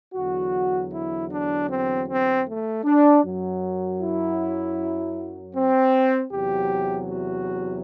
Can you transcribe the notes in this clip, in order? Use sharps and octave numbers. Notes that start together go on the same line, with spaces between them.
E2 D3 F#3 F#4
E4
D4
C4
C4
A3
D4
F#2 F#3
E4
C4
E2 C3 F#3 G4
F#4